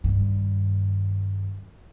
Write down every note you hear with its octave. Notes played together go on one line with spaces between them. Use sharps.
G2 D#3